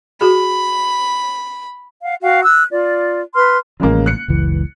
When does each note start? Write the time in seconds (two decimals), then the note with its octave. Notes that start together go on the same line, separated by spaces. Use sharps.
0.21 F#4 G#4 B5
2.03 F5 F#5
2.21 F#4 F5 G5
2.44 E6 F#6
2.71 F4 D5
3.34 B4 C6 F6
3.80 A1 C#3 F3 G#3 A#3
4.06 F#6 C#7
4.28 F#1 C#2 E3